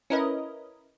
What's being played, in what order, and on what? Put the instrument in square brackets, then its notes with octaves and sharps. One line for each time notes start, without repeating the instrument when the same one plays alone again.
[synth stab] C#4 E4 A#4 B4 D#5